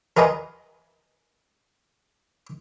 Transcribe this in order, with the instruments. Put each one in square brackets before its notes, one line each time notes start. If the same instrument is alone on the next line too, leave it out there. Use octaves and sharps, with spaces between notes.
[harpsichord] A#4 B4 D#5 G#5 A#5 C6